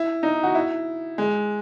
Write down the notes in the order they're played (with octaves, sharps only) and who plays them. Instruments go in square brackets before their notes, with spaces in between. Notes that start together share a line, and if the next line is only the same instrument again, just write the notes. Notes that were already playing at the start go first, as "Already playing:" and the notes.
Already playing: [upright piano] E4
D#4
F#4
E4
G#3